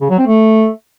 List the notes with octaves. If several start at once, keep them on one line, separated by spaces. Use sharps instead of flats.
C#3
F#3
C4
A3